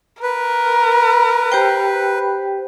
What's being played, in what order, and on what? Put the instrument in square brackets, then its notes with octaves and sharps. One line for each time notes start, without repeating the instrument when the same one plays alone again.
[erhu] A#4 [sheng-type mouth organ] B4
[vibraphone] G4 C5 G5